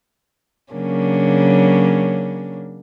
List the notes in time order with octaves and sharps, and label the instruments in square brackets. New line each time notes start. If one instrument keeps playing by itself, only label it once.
[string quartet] C#3 F#3 A#3 C#4 D4